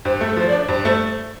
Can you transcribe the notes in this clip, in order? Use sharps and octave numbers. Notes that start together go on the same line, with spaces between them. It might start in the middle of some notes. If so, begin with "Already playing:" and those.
G2 C5
A3
A4
F3 C5
D5
D4
G2 C5
A3 C5